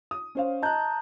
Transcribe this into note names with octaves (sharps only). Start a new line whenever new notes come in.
D#6
C#4 C5 F5
D#5 A5 A#5 F#6 G6